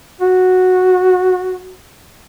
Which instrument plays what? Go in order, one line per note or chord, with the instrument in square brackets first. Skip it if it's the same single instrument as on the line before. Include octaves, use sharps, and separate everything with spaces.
[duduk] F#4